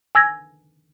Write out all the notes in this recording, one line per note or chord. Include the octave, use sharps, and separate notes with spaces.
G#5 E6 G#6 A#6